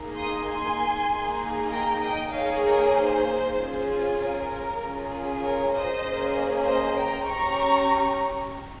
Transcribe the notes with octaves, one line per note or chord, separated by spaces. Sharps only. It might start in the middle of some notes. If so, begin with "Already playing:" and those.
Already playing: A#3 D#4 G#4
C6 D#6
G#5 C6
A#3 D#4 G#4
G5 A#5
D#5 G5
A#3 D#4 G#4 C#5 F5
A#4 C#5
C5
C#4 F4 G#4
A#4
C#4 F4 G#4
A#4 C#5
C5 D#5
A#3 C#4 G#4
C5 D#5
G5 A#5
C#4 G4 A#5 C#6